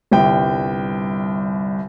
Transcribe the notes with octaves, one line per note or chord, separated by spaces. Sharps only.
G1 C2 G5